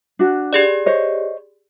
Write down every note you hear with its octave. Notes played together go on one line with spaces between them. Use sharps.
D4 F#4
G4 G#4 D5
C5 C#5 D#5